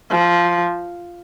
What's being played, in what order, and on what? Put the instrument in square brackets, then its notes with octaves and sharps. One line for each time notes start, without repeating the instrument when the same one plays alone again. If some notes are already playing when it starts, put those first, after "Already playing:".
[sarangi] F3